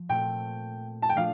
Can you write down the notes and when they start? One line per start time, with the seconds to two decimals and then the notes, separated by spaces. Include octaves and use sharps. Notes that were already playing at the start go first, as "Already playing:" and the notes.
Already playing: F3
0.09 A#2 A3 C4 G5
1.02 A5
1.09 G5
1.15 A#2 F3 A3 D4 F4 F5